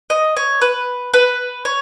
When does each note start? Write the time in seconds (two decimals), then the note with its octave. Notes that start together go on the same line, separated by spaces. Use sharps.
0.10 D#5
0.37 C#5
0.62 B4
1.14 B4
1.65 C#5